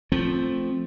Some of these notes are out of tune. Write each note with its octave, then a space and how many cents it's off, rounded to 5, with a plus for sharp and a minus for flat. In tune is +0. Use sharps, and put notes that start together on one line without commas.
F3 +0 A3 +0 C4 +5